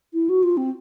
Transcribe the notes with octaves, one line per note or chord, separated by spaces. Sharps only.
E4
F#4
F4
C4